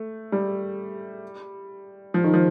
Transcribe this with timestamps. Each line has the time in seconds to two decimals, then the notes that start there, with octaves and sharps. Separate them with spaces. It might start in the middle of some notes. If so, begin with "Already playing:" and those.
Already playing: A3
0.32 G3
2.14 F3
2.24 D#3
2.34 F3